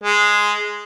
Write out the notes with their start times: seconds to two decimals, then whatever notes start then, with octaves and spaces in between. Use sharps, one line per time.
0.04 G#3